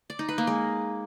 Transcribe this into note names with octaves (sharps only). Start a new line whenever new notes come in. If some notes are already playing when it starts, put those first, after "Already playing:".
D5
D#4
B4
A#3
G#3